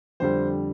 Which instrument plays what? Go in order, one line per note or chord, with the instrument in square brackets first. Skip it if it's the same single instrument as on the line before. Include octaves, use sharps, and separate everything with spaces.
[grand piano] F2 D3 G3 C5